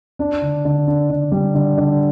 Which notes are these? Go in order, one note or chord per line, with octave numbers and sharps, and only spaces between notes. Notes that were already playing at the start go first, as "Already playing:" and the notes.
D4
D3
D3
D4
D3
G3
D3
D3